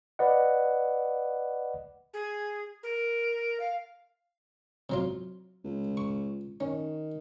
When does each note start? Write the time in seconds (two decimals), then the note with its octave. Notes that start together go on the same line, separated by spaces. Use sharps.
0.19 B4 D5 D#5 F#5
2.13 G#4
2.83 A#4
3.60 F5
4.90 C3 F#3 F4
5.64 C#2
5.97 C#6
6.60 D#3 C#4